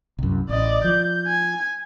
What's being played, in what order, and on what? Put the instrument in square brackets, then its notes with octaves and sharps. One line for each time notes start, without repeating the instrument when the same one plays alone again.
[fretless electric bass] C2 F#2
[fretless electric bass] A1 [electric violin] D5 D#5
[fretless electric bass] F3 [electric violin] G6
[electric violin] G#5